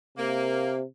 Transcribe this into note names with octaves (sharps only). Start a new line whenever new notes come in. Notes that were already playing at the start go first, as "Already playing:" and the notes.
C3 A#3